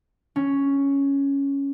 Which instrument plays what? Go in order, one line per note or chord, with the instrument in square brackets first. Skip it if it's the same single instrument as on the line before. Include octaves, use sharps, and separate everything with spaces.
[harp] C#4